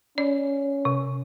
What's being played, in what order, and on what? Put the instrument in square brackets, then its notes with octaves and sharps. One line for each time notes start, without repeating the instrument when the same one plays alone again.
[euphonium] C#4 [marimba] D5
[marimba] C3